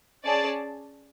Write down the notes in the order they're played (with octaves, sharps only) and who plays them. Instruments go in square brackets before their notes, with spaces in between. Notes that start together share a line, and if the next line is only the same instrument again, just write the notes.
[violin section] C#4 G#4 D5 A5